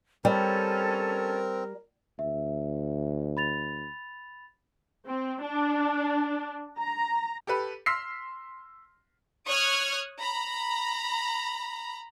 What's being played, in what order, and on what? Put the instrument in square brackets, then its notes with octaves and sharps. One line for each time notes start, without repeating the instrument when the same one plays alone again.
[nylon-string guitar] G3 [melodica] C4 [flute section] C#4 A4 [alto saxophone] A#4
[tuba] D2 [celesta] E5
[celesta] B5 A6 F7
[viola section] C4
D4
A#5
[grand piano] G4 A4 B4
C6 E6 F6 B6 C7
[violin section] C#5 C#6 D#6 F6 F#6 G#6
A#5 B5